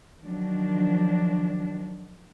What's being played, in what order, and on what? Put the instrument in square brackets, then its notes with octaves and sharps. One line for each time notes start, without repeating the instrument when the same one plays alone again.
[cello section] D#3 F3 F#3 D4